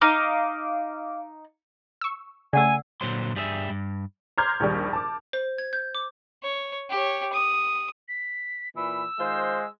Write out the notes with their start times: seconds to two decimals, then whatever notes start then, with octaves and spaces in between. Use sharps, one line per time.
0.02 D#4 F5 D6
2.01 C#6 E6
2.53 C#3 A3 D5 F#5 G#5 E6
3.01 A#2 D3 F#3 C5 C6
3.36 G2 G3 G#4 A#4 E5
3.70 G2
4.38 A#5 C6 D6 F6 G6 G#6
4.60 A#1 D#2 G3
4.93 A5 D6
5.33 C5
5.58 G#6
5.73 G6
5.95 D6
6.43 C#5
6.90 G4 C#5
7.32 D#6
8.08 B6
8.76 A#2 E3 B5 E6
9.20 D#3 G#3 F4 C5